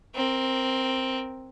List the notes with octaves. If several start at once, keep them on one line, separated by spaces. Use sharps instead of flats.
C4 A#4